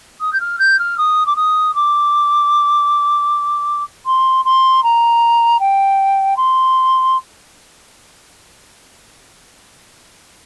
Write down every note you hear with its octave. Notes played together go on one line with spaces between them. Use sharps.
D#6
G6
F6
G6
F6
D#6
D6
D#6
D6
C6
C6
A#5
G5
C6